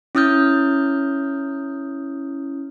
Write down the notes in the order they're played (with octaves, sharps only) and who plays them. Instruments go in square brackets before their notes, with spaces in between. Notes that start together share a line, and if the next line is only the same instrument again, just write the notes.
[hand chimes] C#4 E4 D#6 F6 G6